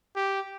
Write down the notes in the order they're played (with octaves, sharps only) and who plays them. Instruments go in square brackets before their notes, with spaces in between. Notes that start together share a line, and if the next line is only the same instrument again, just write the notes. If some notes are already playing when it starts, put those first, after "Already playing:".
[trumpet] G4